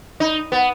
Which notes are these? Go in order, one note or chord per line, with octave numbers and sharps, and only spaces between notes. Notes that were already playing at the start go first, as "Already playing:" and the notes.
D#4
B3